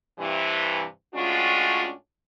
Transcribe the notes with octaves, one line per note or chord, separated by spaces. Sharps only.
G2 C3 E3
A2 G#3 C#4 D4 F4 F#4